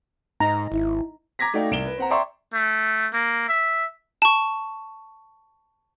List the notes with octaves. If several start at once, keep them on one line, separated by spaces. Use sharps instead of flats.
G#2 D#4 A#5
G#1 E4
A#5 D6 G#6 A#6 B6
A3 D#4 F#4 D5 F5 G5
C2 D7 E7 G7
B4
C4 F#5 A#5
D5 E5 G5 A#5 C6 C#6
A3
A#3
E5
A5 C#6